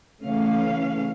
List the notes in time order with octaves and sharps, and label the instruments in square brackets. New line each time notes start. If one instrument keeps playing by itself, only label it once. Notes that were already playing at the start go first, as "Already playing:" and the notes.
[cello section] C#3 E3 A3 C#4 F5